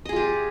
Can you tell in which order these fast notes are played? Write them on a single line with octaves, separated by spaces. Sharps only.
D#5 G#4 F4 G4